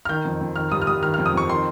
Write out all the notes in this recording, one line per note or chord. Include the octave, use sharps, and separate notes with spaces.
F6
D#3 G6
F2
F2
D#3 F6
G2 D#6
F6
G2 D#6
D#3 F6
F6
F2
D#6
F2 C#6
D#3 C6